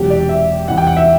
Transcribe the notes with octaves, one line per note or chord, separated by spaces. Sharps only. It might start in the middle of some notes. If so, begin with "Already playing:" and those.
Already playing: E1 E2 C3 F#3 G4
D5
E5
E2 C3 E3 G3 F#5
G5
F#5
E5